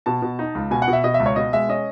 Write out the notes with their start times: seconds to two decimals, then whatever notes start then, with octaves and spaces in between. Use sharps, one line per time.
0.06 B2 A5
0.22 B2
0.39 D#4
0.55 C#2
0.71 B2 G#5
0.82 F#5
0.88 B2
0.93 E5
1.04 B2 D#5
1.14 E5
1.20 C#2
1.26 C#5
1.36 B2 D#5
1.53 G#3 E5
1.69 C#4 D#5